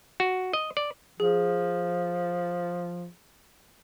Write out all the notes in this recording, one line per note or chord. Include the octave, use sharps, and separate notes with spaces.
F#4
D#5
D5
F3 G#4